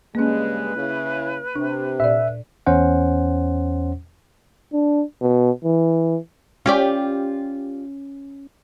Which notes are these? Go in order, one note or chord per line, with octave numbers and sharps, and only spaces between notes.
G2 C#3 G#3 A#3 C#4 B4
C#3 E4
C3 D4
A#2 D5 E5
E2 C#4 C5 F#5
D4
B2
E3
C#4 F4 G4 D5